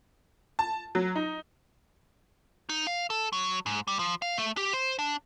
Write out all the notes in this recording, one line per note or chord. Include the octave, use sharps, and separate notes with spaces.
A5
F#3
D#4
D#4
F5
A4
F#3
G#2
G3
F3
F5
A3
G4
C5
D4